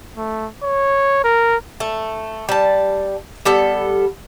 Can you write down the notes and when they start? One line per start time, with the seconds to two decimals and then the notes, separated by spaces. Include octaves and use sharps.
0.17 A3
0.63 C#5
1.24 A#4
1.80 A3
2.49 G3 A5
3.45 G3 B3 A4